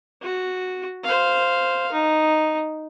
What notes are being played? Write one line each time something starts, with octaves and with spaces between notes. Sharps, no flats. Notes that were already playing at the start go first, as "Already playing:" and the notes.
F#4
C5 F5
D#4